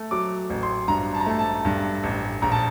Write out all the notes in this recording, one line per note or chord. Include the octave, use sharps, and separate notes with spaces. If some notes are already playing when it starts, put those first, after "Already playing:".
Already playing: A3
F#3 D6
A1
C6
G2 A#5
A5
A#5
A3 A5
A5
G2
A1
A#1 A#5
A5